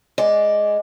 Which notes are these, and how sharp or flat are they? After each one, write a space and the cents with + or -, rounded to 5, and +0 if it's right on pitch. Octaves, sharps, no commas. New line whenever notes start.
G#3 +0 D5 -5